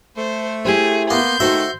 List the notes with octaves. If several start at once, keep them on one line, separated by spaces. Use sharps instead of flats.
A3 C5
E4 G4 G#4 C5
A#3 B3 C6 G6
D#3 A3 F#4 C5 E5